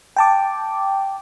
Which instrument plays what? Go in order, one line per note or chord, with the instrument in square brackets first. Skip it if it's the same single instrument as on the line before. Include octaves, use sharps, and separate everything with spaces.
[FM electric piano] G5 A5 D6